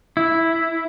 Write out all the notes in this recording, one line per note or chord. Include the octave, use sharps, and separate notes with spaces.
E4